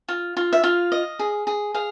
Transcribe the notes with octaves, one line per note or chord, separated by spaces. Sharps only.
F4
F4
E5
F4 F5
D#5
G#4
G#4
G#4 F5